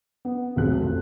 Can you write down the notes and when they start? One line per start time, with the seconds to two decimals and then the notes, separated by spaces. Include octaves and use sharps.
0.25 B3
0.56 F1 B1 C3 F#3 G#4 F#6
0.80 F2 A4